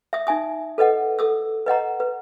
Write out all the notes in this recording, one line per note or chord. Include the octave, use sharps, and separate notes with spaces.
E5 D#6
D#4 E5 G#5 D#6
A4 B4 D#5 F#5
A4 D#6 E6
B4 D#5 F#5 A#5
B4